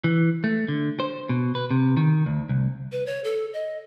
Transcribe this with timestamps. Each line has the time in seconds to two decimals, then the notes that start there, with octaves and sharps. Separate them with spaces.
0.04 E3
0.44 A3
0.68 D3
1.00 C5
1.29 B2
1.55 B4
1.71 C3
1.97 D#3
2.26 D2
2.49 C2
2.92 B4
3.06 C#5
3.24 A4
3.53 D#5